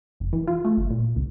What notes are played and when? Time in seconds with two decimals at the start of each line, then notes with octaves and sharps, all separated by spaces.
0.20 F#1
0.33 E3
0.47 F4
0.65 A3
0.77 G1
0.90 A#2
1.16 C#2